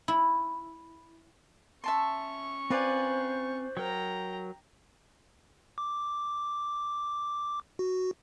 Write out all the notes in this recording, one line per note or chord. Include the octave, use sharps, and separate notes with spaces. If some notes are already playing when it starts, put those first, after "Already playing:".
E4
C#4 E5 A5 C6 C#6
C4 F4 B4 C5 D5 F5 G#5
F#3 A#4 G5 A#5
D6
F#4